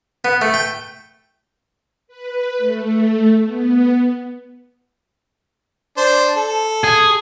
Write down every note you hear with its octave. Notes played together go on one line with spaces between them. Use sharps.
B3
A3
G5
B4
A3
B3
D4 C5
A4
G#4